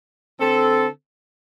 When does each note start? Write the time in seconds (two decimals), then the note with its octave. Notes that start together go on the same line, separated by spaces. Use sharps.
0.40 D3 C4 A4